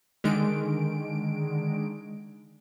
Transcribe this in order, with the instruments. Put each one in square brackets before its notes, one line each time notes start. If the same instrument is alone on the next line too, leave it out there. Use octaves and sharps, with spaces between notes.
[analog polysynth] D3 D#3 G#3 D7